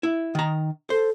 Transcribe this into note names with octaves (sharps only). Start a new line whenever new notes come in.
E4
D#3 A#5
A4 C5